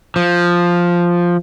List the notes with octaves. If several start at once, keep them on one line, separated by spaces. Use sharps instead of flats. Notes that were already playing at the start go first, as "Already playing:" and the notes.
F3